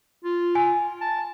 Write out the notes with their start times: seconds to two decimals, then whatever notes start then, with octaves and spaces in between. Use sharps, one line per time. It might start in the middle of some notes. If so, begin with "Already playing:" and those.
0.24 F4
0.55 G#5
1.01 A5